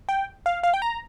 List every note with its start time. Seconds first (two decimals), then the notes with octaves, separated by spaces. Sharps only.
0.09 G5
0.46 F5
0.63 F5
0.74 G5
0.82 A#5